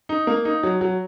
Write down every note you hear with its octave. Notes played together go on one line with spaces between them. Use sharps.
D#4
A#3
D#4
F#3
F#3